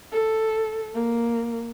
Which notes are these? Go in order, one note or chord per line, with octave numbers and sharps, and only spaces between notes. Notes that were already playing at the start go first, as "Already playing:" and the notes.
A4
A#3